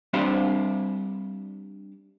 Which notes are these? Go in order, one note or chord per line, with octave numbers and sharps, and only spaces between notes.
G3 C4 D4 G4 C5 F5